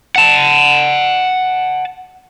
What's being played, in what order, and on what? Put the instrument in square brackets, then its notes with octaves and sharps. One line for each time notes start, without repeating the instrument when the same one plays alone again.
[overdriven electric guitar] F#5 A5